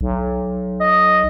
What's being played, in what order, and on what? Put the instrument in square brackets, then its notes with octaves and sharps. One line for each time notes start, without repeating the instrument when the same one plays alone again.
[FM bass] B1
[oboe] D#5